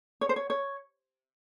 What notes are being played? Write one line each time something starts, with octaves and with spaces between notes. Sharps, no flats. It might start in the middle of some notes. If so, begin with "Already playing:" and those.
C#5
C5
C#5
C#5